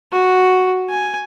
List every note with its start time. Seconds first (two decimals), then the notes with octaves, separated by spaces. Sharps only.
0.12 F#4
0.90 G#5